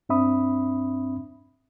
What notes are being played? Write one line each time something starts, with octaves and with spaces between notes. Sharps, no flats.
G2 C4 D4 E5 B5 D#6